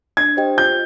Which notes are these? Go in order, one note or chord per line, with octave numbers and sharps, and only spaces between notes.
D4 G#6
G4 C5 D#5 G5
F4 G6